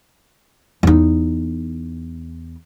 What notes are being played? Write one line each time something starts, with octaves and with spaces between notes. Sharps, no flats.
E2 D#4